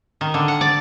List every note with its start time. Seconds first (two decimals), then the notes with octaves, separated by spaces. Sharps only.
0.21 D#3
0.34 D3
0.48 F#5
0.61 D5